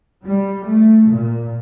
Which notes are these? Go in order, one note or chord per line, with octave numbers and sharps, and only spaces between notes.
G3
A3
A#2